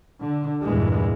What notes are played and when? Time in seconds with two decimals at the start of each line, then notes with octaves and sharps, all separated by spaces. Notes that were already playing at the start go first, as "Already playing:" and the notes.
0.20 D3
0.63 E2 G2 A#2 E3 G#3